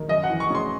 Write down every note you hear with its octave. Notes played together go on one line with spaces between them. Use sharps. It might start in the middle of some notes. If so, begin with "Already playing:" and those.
Already playing: D#3
F#2 D#5
F#5
E3
C#6
C#3 C6